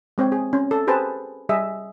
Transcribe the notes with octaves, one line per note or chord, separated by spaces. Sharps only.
G#3 C4 C#5 G5
G#4
C#4
A4
G4 G#4 B4 C5 A5
G3 G#4 D#5 E5